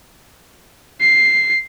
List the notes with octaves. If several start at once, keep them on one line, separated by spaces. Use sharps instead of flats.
C7